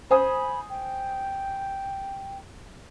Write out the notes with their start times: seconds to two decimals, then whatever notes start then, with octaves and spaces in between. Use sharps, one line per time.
0.11 C5 G#5 B5 D#6
0.70 G5